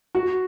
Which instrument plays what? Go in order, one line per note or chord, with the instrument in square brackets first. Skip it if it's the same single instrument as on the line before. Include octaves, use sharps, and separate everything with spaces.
[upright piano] F#4